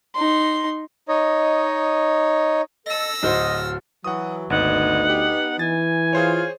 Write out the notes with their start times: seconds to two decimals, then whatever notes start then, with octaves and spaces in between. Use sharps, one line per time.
0.15 D#4 C6
1.08 D#4 C#5 D#5
2.86 A4 D#5 E6 A#6
3.23 D1 F#4 C5 D#5 F6
4.04 E3 F#3 F#5 D#6
4.50 G#1 D2 B3 D#4 F#5
5.09 G4
5.59 E3 G#5 A6
6.13 F4 G#4 C5 C#5